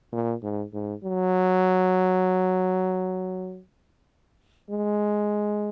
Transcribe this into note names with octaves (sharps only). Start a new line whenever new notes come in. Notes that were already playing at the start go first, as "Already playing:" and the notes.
A#2
G#2
G#2
F#3
G#3